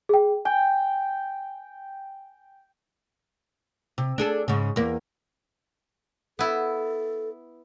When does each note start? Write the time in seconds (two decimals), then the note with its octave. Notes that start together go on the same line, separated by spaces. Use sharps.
0.09 G#4 G5
0.45 G5 G#5
3.98 C3
4.18 D4 G#4 A4
4.48 G#2 C#3
4.76 E2 A#3
6.39 B3 E4 A4